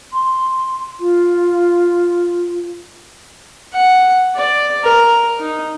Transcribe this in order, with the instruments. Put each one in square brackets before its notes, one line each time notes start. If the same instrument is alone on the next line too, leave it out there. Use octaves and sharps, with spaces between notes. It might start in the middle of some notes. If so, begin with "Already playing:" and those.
[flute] C6
F4
[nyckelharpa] F#5
D5
A#4
D#4